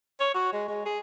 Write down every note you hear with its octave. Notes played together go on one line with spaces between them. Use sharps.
C#5
F#4
G#3
G#3
G#4